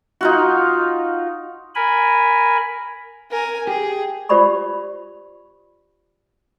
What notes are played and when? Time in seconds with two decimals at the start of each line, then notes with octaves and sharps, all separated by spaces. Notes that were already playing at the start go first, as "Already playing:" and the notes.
0.21 D#4 F4 F#4
1.75 A#4 G#5 B5
3.31 A#4 G#5
3.67 G4 G#4
4.29 F4 G4 C5 D5 B5 C#6